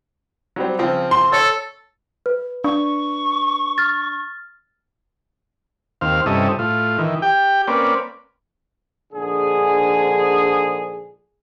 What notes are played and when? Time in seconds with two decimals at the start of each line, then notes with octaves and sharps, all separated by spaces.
0.56 F#3 G3 C4
0.79 C#3 F3 C4
1.11 C6
1.32 A4 C#5
2.26 B4
2.64 D4 C#6
3.78 F6 A6
6.01 D#2 C4 F5
6.26 G2 C3 C#4 E4 A4 D#5
6.59 A2 F4
6.98 D#3 E3
7.22 G4 G5
7.67 A#3 C4 C#4 B4 D5
9.13 A#1 G#2 D3 G#4